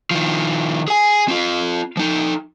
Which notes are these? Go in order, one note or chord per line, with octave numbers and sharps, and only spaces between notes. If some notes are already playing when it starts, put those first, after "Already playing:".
D#3 F3
G#4 G#5
C4 F4
F3 D#4